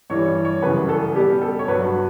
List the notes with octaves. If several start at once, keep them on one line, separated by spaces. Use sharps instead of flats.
G2 E3 G3 C#5
D5
C#5
F#2 C#3 E3 G3 B4
A4
B2 G3 G4
A4
C#5
G2 F#3 B4